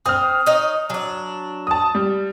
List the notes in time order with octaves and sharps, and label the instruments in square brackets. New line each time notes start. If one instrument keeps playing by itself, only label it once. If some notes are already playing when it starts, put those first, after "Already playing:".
[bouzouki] C4 [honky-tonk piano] D#6 F6
[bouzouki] D#4 C#5 D#5
F#3 D4
[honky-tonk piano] A5 D#6
G3